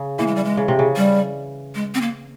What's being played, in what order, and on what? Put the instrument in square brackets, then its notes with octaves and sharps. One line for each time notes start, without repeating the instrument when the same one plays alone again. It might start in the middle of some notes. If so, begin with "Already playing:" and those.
Already playing: [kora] C#3
[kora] E3 [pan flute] A#3
[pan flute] G#3
G3
G#3
[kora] C#3
C3
C#3
[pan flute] G3
G#3
C4
A#3